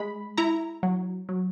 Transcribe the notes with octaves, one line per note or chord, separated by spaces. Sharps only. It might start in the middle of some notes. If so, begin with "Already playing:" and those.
Already playing: G#3 B5
E4 A#5
F#3
F#3